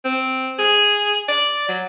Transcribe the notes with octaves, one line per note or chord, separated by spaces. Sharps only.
C4
G#4
D5
F#3